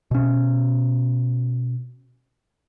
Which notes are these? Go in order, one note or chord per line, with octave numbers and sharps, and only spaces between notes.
B2 C#4